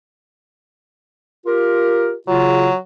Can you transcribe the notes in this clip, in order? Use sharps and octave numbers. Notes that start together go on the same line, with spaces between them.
F4 G4 A#4
C#3 F#3 F4